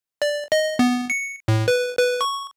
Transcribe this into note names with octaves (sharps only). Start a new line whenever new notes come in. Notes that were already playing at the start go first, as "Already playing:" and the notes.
D5
D#5
B3
C#7
A2
B4
B4
C#6